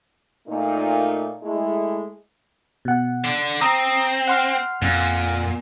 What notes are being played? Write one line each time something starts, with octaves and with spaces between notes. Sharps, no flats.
A#2 A3 D#4
G#3 A3 E4
B2 F#5
D3 D4
C4 A#5 D#6 E6
F#5 C6 F6
F2 A#2